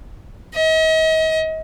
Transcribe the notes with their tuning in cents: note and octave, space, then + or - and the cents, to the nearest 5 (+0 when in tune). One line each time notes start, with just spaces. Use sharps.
D#5 +40